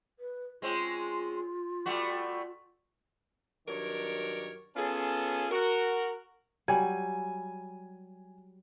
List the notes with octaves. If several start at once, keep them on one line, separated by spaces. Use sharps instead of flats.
B4
G#3 C4 C#4 F4
G3 A3 F#4
G2 D#3 F#3 A#4 C#5 D5
B3 C#4 F4 G#4 A4
F#4 A#4
F#3 G3 G#5